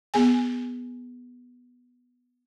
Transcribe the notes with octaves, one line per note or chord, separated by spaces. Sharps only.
B3 G#4 G#5